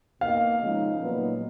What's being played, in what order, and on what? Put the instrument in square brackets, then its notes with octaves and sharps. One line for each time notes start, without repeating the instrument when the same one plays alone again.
[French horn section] B2 A#3 D#4 [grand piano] F5
[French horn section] C#3 F3 G#3 D#4
A#2 F#3 B3 D#4